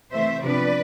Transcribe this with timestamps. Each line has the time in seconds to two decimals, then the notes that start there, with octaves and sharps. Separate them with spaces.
0.12 C3 E3 A3 C5 E5
0.43 C3 F3 B3 D4 B4 D5